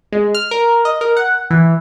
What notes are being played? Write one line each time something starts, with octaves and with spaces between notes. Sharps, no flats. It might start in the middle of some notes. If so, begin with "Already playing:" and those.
G#3
F6
A#4
D#5
A#4
F#5
E3